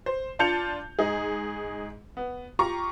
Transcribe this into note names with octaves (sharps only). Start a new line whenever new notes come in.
C5
D4 F4 A5 G6 C#7 F7
G#2 D#4 G#4
B3
F4 G4 A#5 C#6